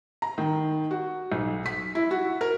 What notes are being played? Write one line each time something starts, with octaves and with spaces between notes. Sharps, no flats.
A#5
D#3
F#4
B1
B6
E4
F#4
A#4